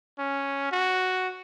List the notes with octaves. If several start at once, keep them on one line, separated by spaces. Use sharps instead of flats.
C#4
F#4